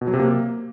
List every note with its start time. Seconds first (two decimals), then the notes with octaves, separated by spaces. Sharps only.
0.01 B2
0.07 F#3
0.14 C3
0.20 A#3